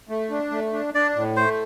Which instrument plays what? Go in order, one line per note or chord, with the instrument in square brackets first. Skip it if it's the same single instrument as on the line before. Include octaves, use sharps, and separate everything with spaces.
[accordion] A3
D4
A3
D4
[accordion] D4 [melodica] D5
[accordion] A2
[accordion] A3 [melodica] C5